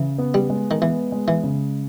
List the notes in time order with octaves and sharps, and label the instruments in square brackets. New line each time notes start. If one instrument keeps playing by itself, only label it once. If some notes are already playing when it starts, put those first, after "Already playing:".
Already playing: [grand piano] C#3 [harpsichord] E3
[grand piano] B3
[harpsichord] G3
[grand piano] G#3
[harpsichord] D#3
[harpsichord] E3 [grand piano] B3
[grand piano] G#3
[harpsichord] E3
[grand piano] C#3